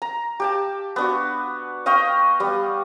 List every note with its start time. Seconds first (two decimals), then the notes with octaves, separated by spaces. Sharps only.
0.02 A#5
0.40 G4 G5 A5
0.96 B3 D4 F#4
1.86 D#5 F5 G5 C#6
2.40 G3 B3